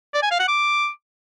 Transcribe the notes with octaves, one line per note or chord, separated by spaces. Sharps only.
D5
G#5
F5
F#5
D6